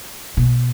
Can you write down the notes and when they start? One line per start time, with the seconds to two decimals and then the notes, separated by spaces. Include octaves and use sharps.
0.37 B2